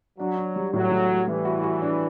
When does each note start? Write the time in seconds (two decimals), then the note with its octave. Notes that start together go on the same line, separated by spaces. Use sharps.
0.19 F#3 D4
0.37 D4
0.56 G3
0.73 A2 F#3
0.91 A2
1.09 G3
1.27 E3 G3
1.45 F#4
1.63 F#4
1.82 D4